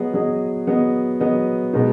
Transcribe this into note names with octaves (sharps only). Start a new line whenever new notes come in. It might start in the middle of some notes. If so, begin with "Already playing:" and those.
Already playing: F#3 B3 G#4 D#5
F#3 B3 G#4 D#5
F#3 B3 G#4 D#5
F#3 B3 G#4 D#5
B2 G#3 B3 D#4